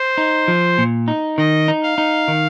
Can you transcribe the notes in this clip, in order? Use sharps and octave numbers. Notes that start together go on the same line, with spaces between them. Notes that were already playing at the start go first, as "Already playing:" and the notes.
Already playing: C5
D#4
F3
A#2
D#4
D#3 D#5
D#4
F5
D#4
D#3